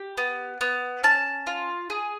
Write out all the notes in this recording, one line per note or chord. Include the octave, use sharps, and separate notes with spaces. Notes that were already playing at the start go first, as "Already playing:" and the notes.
Already playing: G4
B3
B3
C#4 A5
F4
G#4